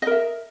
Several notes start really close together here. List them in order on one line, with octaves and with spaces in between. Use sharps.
D#5 A#4 E5